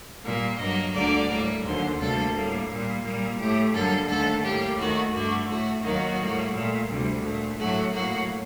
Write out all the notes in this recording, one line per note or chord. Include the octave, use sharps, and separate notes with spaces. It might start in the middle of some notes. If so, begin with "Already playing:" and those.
A#2 G3 A#3
G2 F#3 A#3 D#5
D2 D3 G3 A#3 D5
A2 G3 A#3
D#2 D3 F#3 C5
D2 C3 G3 A#3 A4
A2 G3 A#3
A#2 G3 A#3
A#2 G3 A#3
A2 A3 G4
F#2 D3 G3 A#3 A4
D#2 D3 A3 A4
A2 G3 A#3 G4
D#2 D#3 A3 F#4
G2 D3 A3 F#4
A2 A3 F#4
D#2 D#3 F#3 A#3 F#4
A2 G3 A#3
A#2 A3
D2 C3 G3
A#2 A3
A2 F#3 A3 F#4
A2 F#3 A#3 F#4